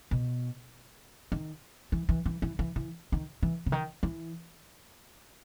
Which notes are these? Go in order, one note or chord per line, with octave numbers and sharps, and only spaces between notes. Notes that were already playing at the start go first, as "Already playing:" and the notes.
B2
D#3
E3
E3
E3
E3
E3
E3
D#3
E3
C#3
D#3
E3